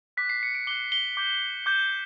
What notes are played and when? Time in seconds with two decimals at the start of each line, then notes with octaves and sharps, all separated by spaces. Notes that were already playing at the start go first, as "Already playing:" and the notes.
0.17 D6 F#6 B6
0.29 C7
0.43 C#7
0.55 D7
0.67 D6 F#6 G7
0.92 G7
1.17 D6 G6
1.66 D6 G6